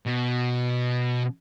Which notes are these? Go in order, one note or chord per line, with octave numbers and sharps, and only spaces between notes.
B2